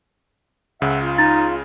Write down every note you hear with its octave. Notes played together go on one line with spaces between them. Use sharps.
C#2 C#3 E5 F#5
F4
D#4 A6